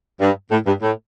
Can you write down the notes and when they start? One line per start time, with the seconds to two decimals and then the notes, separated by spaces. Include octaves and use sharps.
0.20 G2
0.51 A2
0.67 G2
0.82 A2